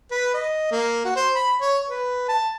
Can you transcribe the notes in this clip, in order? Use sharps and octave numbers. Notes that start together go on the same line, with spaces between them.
B4
D#5
A#3
F#4
C5
B5
C#5
B4
A5